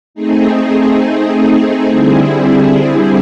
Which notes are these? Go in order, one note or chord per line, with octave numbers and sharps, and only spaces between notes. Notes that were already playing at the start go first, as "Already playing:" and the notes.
A3 C4 D#4 G#4
D3 G3 C4 E4 G#4